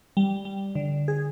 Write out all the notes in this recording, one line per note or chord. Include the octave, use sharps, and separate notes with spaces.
G3
G3
D3
G#4